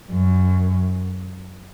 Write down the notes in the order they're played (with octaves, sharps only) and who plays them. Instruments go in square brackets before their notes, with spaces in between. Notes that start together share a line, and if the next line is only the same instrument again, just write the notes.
[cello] F#2